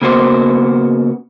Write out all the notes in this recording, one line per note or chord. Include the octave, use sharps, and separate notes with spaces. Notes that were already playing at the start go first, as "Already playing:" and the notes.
C#3 A#3 B3 F#4 C5